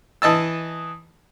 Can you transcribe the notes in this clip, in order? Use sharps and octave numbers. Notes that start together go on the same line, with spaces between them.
E3 D#5 A5 E6